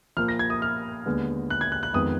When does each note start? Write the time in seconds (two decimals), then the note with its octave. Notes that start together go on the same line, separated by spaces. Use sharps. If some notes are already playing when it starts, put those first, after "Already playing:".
0.17 A#2 F3 A#3 F6
0.28 A#6
0.39 G#6
0.50 D#6
0.62 F6
1.06 D#2 D3 G#3 B3
1.50 F#6
1.61 G#6
1.72 F#6
1.83 F#6
1.94 F2 D#3 G#3 B3 D#6